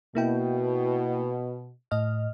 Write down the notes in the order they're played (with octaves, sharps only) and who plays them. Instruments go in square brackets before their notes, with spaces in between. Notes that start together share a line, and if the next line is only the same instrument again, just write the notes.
[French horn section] B2 [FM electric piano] A#3 E4 G5
[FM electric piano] A2 D#5 F6